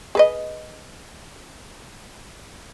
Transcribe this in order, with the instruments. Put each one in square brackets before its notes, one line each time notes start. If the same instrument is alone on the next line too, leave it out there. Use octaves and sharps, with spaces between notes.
[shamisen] G#4 B4 D#5